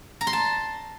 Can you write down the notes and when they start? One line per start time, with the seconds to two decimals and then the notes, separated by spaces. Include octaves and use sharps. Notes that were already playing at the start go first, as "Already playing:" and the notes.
0.21 A#5
0.27 C6
0.33 A5